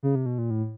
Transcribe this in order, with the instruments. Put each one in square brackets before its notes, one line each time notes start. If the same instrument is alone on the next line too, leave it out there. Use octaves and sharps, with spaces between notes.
[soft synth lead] C#3
C3
B2
A#2
A2